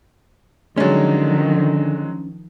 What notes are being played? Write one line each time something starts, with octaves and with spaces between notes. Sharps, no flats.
D3 D#3 F3 F#3 G#3 C#4 D4